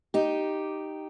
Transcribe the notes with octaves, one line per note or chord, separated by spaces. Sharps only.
D#4 G4